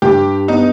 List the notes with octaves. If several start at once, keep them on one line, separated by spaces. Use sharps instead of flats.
G2 G4
B3 D#4